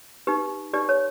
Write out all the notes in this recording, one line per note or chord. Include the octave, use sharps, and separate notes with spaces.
D#4 G4 B4
D#4 G4 B4 D5
C#5